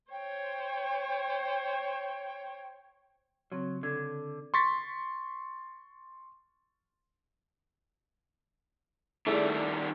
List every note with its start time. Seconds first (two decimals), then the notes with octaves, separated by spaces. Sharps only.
0.11 C5 C#5 G5
3.52 C#3 F#3 C4
3.83 D3 G#6
4.54 C6 C#6 A6 B6
9.26 D#3 G3 A3 E4 G#4 D5